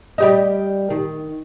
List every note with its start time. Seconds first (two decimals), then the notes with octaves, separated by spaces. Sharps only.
0.18 G3 G4 D#5
0.90 D#3